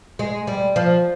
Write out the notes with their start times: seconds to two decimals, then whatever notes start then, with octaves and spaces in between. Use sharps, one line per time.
0.19 G#3
0.47 G3
0.76 F3